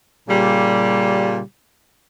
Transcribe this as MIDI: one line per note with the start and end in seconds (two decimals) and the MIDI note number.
0.29 1.40 46
0.29 1.40 49
0.29 1.40 55